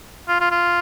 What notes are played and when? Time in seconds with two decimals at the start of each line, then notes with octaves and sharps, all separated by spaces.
0.29 F4
0.41 F4
0.51 F4